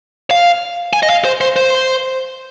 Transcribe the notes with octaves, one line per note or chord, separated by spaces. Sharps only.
F5
G#5
D#5
F5
C5
C5
C5